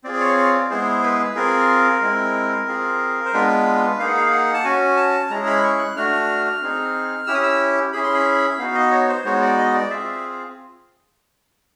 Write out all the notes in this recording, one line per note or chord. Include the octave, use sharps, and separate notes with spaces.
C4 F4 G#4 D5
D5
C#5
C#5
D5
G#3 B3 E4 G#4 C5
B4
C4 F4 G#4 A#4
G#3 C4 E4
C4 F4 G#4
C5
G#3 B3 D4 F4 B4
A#3 D#4 G#4 F5
F#5
F5
F#5
A5
C#4 F#4 G#5
A5
G#3 C#4 E4 G#4 A#5
B5
C#6
F#6
A3 D4 F#4 F6
C4 D#4 G#4
C#4 E4 G4 E6
D#6
E6
C#4 E4 G#4 B5
C6
B5
B3 D#4 F#4 F5
D#5
C#5
C5
G#3 B3 D#4 F#4 C#5
D5
D#5
D5
C4 F4 G#4 E5